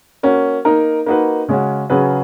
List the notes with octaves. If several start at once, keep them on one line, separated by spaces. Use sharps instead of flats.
A#3 C#4 F#4
A#3 D#4 A#4
A#3 D#4 F#4 B4
C#3 G#3 C#4 F#4
C#3 F#3 C#4 G#4 B4